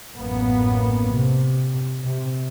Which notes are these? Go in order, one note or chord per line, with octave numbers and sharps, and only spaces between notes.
A1 F#2 A#3 B3
C3
C3